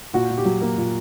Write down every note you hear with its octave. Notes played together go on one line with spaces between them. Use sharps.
A#2 F#4
A#2
G4
F#3
A#3
A#2